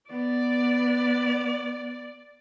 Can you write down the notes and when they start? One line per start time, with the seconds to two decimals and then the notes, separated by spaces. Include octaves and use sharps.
0.11 B3 D5